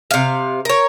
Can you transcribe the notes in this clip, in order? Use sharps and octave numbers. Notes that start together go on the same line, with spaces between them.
C3 F5
A#4 C#5